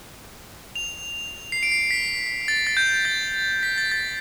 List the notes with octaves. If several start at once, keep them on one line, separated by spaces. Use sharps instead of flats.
F7
C7
D7
C7
B6
A6
A6
G6
A6
B6
A6
A6